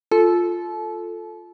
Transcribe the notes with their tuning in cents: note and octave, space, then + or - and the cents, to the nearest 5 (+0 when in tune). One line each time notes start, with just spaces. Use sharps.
F4 +5 A4 +0 A5 -35